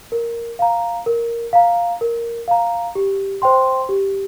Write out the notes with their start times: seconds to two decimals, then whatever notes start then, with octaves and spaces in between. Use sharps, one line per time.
0.12 A#4
0.59 F5 A#5
1.06 A#4
1.53 F5 A#5
2.01 A#4
2.48 F5 A#5
2.95 G4
3.42 C5 G5 C6
3.89 G4